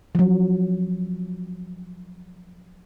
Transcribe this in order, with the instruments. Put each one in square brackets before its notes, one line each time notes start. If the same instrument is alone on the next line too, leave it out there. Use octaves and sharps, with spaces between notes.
[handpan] F3 F#3